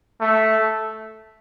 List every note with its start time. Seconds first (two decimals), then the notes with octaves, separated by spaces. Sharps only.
0.21 A3